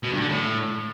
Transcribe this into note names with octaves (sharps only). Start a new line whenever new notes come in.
B2
G2
D3
A2